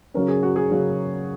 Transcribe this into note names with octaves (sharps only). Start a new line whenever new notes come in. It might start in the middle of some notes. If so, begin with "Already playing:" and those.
C#3 F#3 C#4 A#4
G#4
F#4
G#4
C#3 F#3 C#4